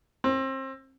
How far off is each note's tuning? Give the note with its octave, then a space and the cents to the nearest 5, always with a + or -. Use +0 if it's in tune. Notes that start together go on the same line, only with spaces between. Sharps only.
C4 +30